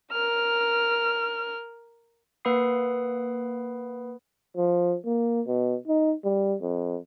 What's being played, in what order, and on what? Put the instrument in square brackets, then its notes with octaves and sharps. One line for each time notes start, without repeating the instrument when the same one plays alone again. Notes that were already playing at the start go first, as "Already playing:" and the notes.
[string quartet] A#4 F6
[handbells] A#3 B4 F#5 B5 D#6 C7
[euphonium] F3
A#3
B2
D#4
G3
F2